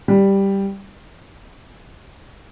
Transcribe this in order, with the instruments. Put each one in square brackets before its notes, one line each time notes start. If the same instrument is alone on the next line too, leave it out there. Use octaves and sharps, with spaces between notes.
[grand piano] G3